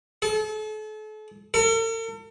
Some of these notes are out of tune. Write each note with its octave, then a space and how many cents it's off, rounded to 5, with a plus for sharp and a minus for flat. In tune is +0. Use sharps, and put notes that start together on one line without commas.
A4 -40
A4 +45